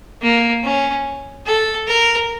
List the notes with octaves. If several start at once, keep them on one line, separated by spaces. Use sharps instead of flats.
A#3
C#4
A4
A#4